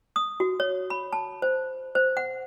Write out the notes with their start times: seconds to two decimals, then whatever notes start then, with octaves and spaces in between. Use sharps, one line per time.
0.16 D#6
0.40 F#4
0.60 C#5
0.90 B5
1.13 A5
1.42 C5
1.95 C5
2.17 F#5